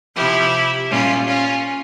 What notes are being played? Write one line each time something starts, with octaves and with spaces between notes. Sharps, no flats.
C3 F3 E4 G4
A#2 G3 C#4 F4
C#4 F4